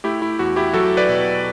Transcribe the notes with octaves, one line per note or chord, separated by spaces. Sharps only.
A3 E4 G4
E4
E2 F#4
E4 G4
F#3 F#4 A4
B4 D5
B2